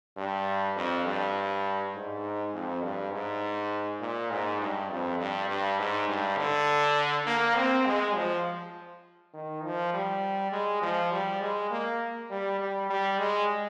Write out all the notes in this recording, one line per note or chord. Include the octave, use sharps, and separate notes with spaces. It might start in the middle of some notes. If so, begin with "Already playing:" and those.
G2
F2
G2
G#2
F2
G2
G#2
A#2
G#2
G2
F2
G2
G2
G#2
G2
D3
A#3
C4
G#3
F3
D#3
F3
G3
G#3
F3
G3
G#3
A#3
G3
G3
G3
G#3